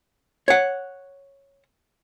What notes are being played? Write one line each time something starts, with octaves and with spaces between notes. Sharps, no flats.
C#5 F#5